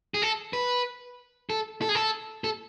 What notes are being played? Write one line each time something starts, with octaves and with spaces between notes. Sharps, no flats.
G#4
A4
B4
A4
A4
G#4
A4
A4